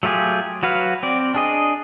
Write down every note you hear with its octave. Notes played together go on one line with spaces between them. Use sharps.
F#3 A3 F4 G4 G#4
F#3 F#4 B4 F5
C4 D5
D4 G#4 D#5